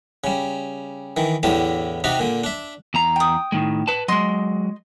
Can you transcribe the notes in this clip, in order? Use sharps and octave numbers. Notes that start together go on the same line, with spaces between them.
C#3 G3
D#3 E3
E2 A2 D3 G4 A5
C3 D#4 F#4 G4
A#2 D3
D4 E5
E2 A#5
G5 D#6
A2 D#3 G#3
B4 A5
F#3 G#3 D#5 C6